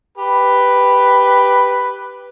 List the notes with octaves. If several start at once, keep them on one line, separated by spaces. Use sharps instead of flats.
G4 B4